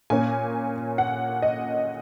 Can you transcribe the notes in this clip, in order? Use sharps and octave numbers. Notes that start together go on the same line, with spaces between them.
A#2 A#3 C#4 G#5
F#5
D#5